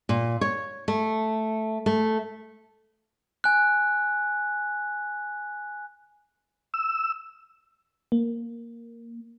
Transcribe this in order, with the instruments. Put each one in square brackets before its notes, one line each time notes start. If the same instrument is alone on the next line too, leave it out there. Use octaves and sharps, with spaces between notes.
[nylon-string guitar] A#2
C#5
A3
A3
[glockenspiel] G#5 F#6
[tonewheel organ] E6
[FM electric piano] A#3